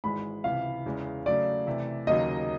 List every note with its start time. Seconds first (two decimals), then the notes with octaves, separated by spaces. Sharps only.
0.04 G#1 G#2 E3 G#3 B5
0.44 C#2 C3 E3 F5
0.86 E2 C#3 E3 G#3
1.26 C#3 F#3 A3 D5
1.67 C3 E3 A3
2.07 D#2 C#3 F#3 A#3 D#4 D#5